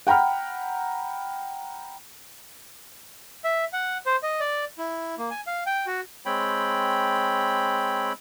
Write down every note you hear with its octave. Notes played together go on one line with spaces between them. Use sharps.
F#5 G5 A#5 B5 F6
E5
F#5
C5
D#5
D5
E4
A#3
G#5
F5
G5
F#4
G#3 C4 C#5 G5 B5